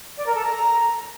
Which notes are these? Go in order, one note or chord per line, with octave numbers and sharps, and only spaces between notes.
D5
A#4
A4
A#5